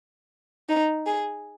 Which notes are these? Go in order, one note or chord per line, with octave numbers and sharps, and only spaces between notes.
D#4
G#4